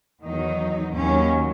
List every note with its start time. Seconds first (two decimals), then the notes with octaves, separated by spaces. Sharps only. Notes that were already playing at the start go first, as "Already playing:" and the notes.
0.23 E2 D#3 F#3 D#4
0.93 D#2 D#3 F#3 C#4